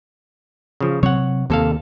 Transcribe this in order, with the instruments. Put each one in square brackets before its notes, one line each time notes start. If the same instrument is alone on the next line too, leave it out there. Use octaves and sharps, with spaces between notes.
[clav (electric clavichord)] C#3 F3
[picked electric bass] C3 F#3 C4 [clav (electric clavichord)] C#5 F#5
[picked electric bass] D#2 D#3 A#3 [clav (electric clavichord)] C3 A4 F5